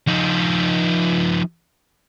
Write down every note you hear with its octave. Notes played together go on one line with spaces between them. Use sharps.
F3 D#4